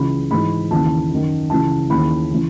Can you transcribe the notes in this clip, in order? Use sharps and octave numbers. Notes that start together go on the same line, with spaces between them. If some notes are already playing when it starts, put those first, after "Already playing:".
Already playing: C#2 C#3 E3 B5
G#2 E3 B5
D#2 C#3 E3 A5
F#2 D#3
C#2 C#3 E3 A5
D#2 C#3 E3 B5
C#3 E3